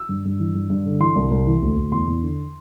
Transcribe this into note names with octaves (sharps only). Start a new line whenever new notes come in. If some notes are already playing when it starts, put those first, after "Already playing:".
Already playing: E6
G2
G2
E3
G2
G2
D3
E3 C6
C2
C2
E3
D2
D2
E2 C6
E2
D3